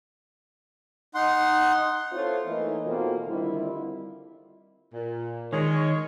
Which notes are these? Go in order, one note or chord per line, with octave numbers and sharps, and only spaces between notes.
D#4 F#5 C6
C4 E4 F4 A4 C5 C#5
E3 A3 A#3 D#4
B2 E3 A3 A#3 C4 F4
D3 D#3 G3 C4 E4 F4
A#2
D#3 G#3 C#5